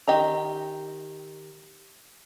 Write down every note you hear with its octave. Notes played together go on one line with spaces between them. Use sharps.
D#3 G4 D#5 A#5